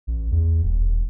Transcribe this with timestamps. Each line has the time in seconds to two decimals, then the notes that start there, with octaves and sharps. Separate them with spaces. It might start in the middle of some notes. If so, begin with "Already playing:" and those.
0.07 A1
0.31 E2
0.63 D#1